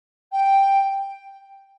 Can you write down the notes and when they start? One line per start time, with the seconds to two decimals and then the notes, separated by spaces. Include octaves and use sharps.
0.32 G5